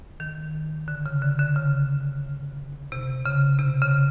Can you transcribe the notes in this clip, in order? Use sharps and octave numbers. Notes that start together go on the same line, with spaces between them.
D#3
D3
C#3
D3
D3
C#3
C3
C#3
C3
C#3